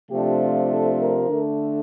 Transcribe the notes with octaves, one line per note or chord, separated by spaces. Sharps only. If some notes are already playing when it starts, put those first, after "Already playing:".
C3 F3 A3 D4 G4
F4
A4
A#4
D3 A3 D4